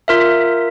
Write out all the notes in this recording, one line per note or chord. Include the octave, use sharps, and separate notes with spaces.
F4 A#4 E5